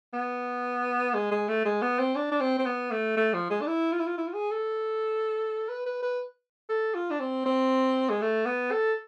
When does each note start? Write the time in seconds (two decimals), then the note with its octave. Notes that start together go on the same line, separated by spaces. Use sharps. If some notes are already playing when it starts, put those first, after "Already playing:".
0.13 B3
1.14 G#3
1.31 G#3
1.48 A3
1.65 G#3
1.82 B3
1.99 C4
2.16 D4
2.32 D4
2.41 C4
2.59 C4
2.66 B3
2.91 A3
3.16 A3
3.33 F3
3.50 G#3
3.61 D4
3.67 E4
3.92 F4
3.99 E4
4.06 F4
4.18 E4
4.27 F4
4.34 G#4
4.51 A4
5.69 B4
5.86 B4
6.02 B4
6.69 A4
6.94 F4
7.10 D4
7.20 C4
7.46 C4
8.10 G#3
8.21 A3
8.46 B3
8.71 A4